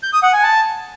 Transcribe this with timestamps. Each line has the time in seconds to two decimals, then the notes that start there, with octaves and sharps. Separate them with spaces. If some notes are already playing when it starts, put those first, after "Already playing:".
0.03 G6
0.13 D#6
0.23 F#5
0.33 G#5
0.43 A5